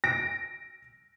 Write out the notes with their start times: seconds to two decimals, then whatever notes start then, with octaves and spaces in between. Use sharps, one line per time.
0.04 A#6 D7